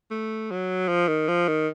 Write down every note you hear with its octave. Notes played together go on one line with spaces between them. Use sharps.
A3
F#3
F3
D#3
F3
D#3